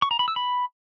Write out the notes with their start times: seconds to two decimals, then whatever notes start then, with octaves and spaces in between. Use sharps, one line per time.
0.02 C#6
0.11 A#5
0.19 B5
0.28 E6
0.36 B5